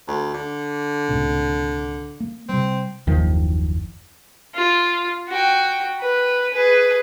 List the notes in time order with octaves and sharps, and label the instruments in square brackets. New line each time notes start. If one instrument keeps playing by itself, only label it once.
[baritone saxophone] D2
D3
[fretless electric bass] C#2 A2 C3
A#3
[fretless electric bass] C3 G3 [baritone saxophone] C4
[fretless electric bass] F#1 D#2 D#3 F3
[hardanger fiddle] F4
F#4 G5
B4
G#4 B4